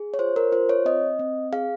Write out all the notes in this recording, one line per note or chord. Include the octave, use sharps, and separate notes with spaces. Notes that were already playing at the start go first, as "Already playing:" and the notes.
Already playing: G#4
C#5
F4 C5
A#4
F4 C5
C#5
C4 D#5
C4
G#4 F5